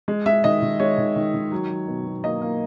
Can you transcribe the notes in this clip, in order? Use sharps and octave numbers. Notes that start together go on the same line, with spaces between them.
G#3
G#3 E5
D#3 D#5
D#3
G#3 C#5
D#3
D#3
D#3
F#3
F#3
B2
B2
A#3 D#5
A#3